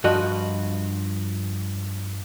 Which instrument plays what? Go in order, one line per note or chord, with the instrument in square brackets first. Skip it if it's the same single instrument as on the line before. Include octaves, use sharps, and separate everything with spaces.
[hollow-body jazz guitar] G2 F3 F#4 D#5